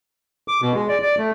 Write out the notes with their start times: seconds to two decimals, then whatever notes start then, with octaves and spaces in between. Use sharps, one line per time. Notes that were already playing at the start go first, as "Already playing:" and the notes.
0.48 D6
0.62 B2
0.74 G#3
0.89 D5
1.02 D5
1.18 A3